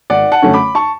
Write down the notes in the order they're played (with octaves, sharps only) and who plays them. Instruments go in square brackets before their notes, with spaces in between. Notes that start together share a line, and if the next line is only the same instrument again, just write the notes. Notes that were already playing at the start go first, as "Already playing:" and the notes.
[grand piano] G#1 D5 F#5
F#5 A5
F#2 D3 A3 C#4
B5 D6
A5 C#6